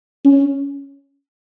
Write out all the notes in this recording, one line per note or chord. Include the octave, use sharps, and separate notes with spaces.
C#4